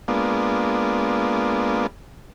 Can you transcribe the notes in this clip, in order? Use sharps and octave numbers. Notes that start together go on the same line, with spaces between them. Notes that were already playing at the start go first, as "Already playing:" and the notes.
G#3 A#3 B3 D4 F4